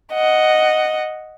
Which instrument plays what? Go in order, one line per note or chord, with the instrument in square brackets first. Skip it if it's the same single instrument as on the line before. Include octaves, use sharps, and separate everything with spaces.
[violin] D#5 F#5